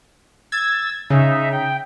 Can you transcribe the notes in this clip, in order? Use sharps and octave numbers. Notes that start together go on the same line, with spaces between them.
E6 G#6 A6
C#3 D#4 E5
G5